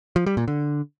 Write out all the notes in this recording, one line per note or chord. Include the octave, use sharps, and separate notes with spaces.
F3
G3
A#2
D3